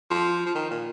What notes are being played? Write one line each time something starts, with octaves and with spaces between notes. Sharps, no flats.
F3
F3
D#3
A#2